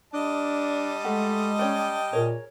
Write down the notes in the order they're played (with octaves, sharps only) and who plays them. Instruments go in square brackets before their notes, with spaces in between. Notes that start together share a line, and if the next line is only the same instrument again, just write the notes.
[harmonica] G3 D#5 A5 [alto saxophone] D4
[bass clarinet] G#3 [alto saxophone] A3 [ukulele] F#5
[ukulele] C#4 C#5 D5 [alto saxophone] G5
[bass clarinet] A#2 [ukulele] G#4 A#4 C#5